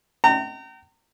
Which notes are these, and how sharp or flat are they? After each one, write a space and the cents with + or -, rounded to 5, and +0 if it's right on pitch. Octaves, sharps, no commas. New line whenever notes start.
G5 -40 A#5 -35